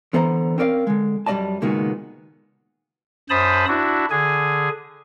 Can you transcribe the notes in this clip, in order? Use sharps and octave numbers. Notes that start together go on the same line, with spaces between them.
D3 E3 B3 C5 D5 A#5
C4 C#4 A#4 D5 E5 F5
D3 G#3
F#2 G3 A3 D5 D#5 A5
C#2 A#2 D#3 G#3 B3 F#4
F#2 C5 A5 B5 D#6
D4 E4 F#4
D3 G#4 G#5